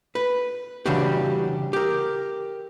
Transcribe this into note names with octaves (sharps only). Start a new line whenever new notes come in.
B4
C#3 E3 G3 D4 F#4 G4
G4 A#4